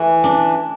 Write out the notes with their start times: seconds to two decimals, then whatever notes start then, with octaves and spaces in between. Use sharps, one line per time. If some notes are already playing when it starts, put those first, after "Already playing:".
Already playing: E3 A3
0.24 D4